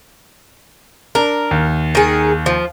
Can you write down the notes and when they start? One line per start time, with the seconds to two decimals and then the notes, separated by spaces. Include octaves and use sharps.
1.15 D4 A#4
1.51 D#2
1.95 D#3 G#4
2.46 F3